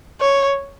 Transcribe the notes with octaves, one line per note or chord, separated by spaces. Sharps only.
C#5